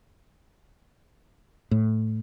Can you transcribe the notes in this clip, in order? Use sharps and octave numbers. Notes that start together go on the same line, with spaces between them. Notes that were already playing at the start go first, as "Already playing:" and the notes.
A2